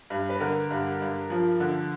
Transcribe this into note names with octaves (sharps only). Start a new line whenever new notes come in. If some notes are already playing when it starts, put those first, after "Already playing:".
G2
B4
D3 A#4
G2
G2
F3
D3